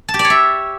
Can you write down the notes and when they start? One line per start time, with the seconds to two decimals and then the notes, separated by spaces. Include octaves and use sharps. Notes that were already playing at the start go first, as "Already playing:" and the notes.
0.08 A5
0.14 G4
0.19 D5
0.25 C#5
0.30 E5